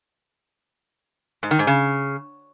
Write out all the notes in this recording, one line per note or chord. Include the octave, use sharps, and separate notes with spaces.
G#2
D#3
G#2
C#3